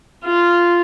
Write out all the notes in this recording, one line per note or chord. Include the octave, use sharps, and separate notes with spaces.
F4